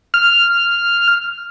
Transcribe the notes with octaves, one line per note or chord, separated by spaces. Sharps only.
F6